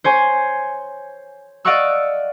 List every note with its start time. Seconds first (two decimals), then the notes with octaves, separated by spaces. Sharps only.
0.04 C5 C#5 G#5
1.65 D5 D#5 F5 F#5 C#6 E6